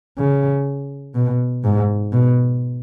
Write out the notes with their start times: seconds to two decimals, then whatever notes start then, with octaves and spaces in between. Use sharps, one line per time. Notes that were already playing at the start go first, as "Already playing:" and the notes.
0.18 C#3
1.15 B2
1.64 G#2
2.13 B2